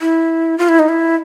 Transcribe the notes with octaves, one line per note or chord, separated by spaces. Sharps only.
E4
F4
E4
D#4
E4